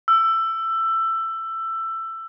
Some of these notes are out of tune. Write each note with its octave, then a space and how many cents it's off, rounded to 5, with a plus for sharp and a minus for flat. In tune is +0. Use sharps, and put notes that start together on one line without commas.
E6 +15